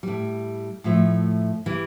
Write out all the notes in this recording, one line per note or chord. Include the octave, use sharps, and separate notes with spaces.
A2 G3
A2 F3 A3
E3 G3